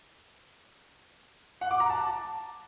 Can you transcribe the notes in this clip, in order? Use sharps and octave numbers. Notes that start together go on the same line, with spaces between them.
F#5
D6
A#5
A5